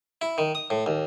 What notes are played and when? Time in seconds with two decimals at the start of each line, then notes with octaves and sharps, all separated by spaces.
0.21 E4
0.38 D#3
0.55 D#6
0.70 A2
0.86 D#2